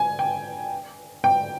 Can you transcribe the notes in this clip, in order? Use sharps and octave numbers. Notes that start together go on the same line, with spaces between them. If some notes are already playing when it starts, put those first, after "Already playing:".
Already playing: G#5
G5
G5